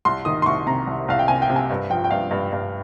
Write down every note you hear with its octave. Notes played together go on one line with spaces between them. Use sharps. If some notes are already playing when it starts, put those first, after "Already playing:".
C2 C6
D#3 D#6
C6
C2 C#6
C3 A#5
C2
C2 F5
G5
C3 G#5
G5
C3
G#5
G2
F3 G5
G5
G2 F5
G2
G2